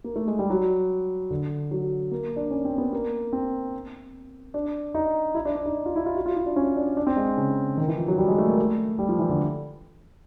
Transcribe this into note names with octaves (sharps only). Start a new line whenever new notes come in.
A#3
A3
G#3
G3
F#3
D3
F#3
A#3
D4
C#4
C4
B3
A#3
C4
D4
D#4
E4
D4
D4
D#4
F4
E4
F4
F#4
F4
E4
D4
C#4
D4
D4
C4
G#3
C#3
D#3
E3
F3
F#3
G3
G#3
A3
A#3
A3
G3
F3
E3
D3